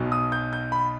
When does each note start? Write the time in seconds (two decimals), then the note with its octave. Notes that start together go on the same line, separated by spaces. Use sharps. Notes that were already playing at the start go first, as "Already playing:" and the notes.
Already playing: B1 B2
0.12 D#6
0.32 G6
0.53 G6
0.72 B5